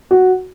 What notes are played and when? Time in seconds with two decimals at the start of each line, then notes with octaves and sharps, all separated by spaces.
0.11 F#4